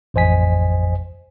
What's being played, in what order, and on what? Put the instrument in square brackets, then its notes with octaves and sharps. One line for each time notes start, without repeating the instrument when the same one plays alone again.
[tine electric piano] A1 F2 C5 D#5 G#5 B6